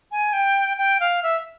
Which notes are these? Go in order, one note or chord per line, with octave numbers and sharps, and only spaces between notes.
G#5
G5
G5
F5
E5